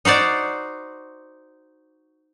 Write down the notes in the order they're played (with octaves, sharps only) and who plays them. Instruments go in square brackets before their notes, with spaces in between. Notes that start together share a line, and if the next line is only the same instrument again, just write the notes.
[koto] D#4 F#4 C5 D5